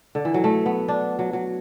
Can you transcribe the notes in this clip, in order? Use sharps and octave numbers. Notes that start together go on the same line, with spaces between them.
D3
E3
F#3
A3
B3
D4
F#3
F#3